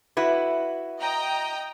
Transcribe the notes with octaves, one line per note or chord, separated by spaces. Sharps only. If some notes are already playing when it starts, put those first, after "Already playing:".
E4 F#4 B4
D#5 G5 A#5